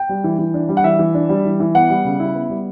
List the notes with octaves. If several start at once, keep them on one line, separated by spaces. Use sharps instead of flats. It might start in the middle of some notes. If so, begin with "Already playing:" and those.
Already playing: G5
G3
E3
E3
D4
G3
F#5
E3 E5
E3
D4
G3
E3
E3
B3 F#5
G3
C#3
E4
B3
G3